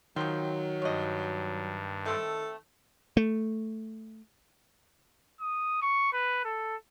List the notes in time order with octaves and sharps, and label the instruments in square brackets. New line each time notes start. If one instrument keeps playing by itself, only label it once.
[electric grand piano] D#3 [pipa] F3 C4 [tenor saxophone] F#3
[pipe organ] G2 [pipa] C#5 D#5
[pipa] A3 C4 [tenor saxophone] A4
[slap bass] A3
[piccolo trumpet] D#6
C#6
B4
A4